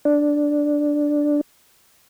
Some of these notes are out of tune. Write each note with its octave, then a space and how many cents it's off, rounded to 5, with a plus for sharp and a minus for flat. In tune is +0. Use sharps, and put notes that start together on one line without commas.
D4 +0